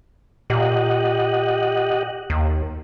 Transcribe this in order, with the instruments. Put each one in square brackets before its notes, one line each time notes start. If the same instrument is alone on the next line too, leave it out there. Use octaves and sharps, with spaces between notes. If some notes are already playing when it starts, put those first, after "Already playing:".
[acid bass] A#2 [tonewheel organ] G4 D#5 F#5
[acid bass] D#2